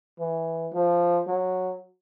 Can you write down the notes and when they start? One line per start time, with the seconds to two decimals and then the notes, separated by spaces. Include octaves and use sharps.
0.19 E3
0.73 F3
1.27 F#3